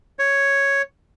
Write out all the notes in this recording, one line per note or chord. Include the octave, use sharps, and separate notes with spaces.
C#5